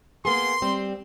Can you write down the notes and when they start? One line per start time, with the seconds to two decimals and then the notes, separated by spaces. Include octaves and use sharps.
0.25 A#3 B3 G#4 C6
0.62 G3 C4